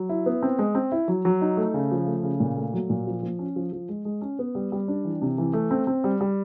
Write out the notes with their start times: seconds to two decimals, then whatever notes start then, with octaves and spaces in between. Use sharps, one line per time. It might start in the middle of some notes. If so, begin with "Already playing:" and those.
Already playing: F#3
0.09 E4
0.26 B3
0.42 C4
0.59 G#3
0.75 C4
0.92 E4
1.08 F#3
1.25 F#3
1.42 D#4
1.57 A3
1.74 C#3
1.91 F3
2.07 A3
2.23 C#3
2.40 A#2
2.57 A3
2.73 F#3
2.90 A#2
3.07 F3
3.22 F3
3.39 C#4
3.56 F3
3.72 F3
3.89 G#3
4.05 G#3
4.21 C#4
4.39 B3
4.55 G3
4.72 G3
4.88 D4
5.05 E3
5.22 C3
5.38 E3
5.54 A3
5.71 C4
5.87 C4
6.04 G3
6.21 G3